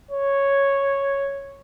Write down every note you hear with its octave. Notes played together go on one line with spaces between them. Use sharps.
C#5